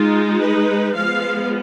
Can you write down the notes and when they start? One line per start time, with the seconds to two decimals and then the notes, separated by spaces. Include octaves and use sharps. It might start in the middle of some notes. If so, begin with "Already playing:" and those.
Already playing: G#3 D#4 F4
0.42 B4
0.96 F3 G#3 B3 F5